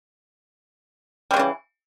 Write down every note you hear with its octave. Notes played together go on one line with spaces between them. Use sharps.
C#3 E3 G3 G#3